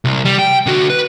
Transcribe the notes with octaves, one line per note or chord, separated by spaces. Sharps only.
C2
G3
G5
D3 F#4
B4